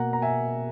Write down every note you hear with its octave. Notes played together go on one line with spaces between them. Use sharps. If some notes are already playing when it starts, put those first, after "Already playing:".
Already playing: B2 A#3 F#5 A#5
A#5
E5 G#5